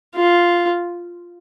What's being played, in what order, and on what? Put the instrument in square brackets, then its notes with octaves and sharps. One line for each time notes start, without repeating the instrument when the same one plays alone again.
[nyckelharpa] F4